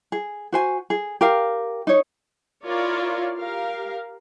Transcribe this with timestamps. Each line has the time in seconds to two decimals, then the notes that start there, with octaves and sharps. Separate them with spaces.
0.12 G#4
0.52 F#4 C5 G#5
0.90 G#4
1.21 G4 A#4 F5
1.87 D#4 C#5
2.65 E4 F4 A#4 C#5 D5 F5
3.38 G4 A#4 F5